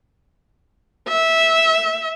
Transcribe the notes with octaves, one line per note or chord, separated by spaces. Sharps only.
E5